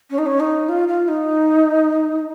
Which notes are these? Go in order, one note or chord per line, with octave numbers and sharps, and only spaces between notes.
C#4
D#4
C#4
D#4
F4
F4
D#4